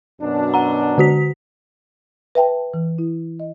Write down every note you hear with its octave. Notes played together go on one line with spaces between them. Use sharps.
F#2 B2 D4
F#5 A#5
D3 F#4 B6
B4 E5 G5 A5
E3
E4
D#5